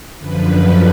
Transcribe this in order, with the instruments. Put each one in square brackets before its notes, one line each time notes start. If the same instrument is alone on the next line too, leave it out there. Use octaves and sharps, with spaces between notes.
[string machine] F#2 D3 F3 B4